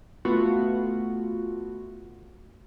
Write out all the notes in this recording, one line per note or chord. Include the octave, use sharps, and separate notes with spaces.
A3 B3 F4 F#4